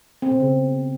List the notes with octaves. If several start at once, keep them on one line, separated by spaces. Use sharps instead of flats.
C4
B2
C#3